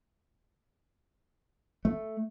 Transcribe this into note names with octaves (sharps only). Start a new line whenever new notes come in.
A3